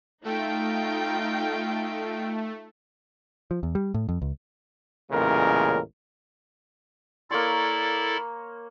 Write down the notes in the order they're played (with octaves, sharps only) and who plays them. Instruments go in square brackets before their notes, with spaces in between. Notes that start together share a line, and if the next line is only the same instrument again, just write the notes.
[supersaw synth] A3 [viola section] D#4 F4 G5
[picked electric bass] F3
E2
G3
A2
F2
C#2
[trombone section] A1 E2 A#2 C#3 G#3 A#4
[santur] A#3 C#5 C6 [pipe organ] E4 A4 D5